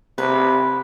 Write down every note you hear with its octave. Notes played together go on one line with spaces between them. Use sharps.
C3 B4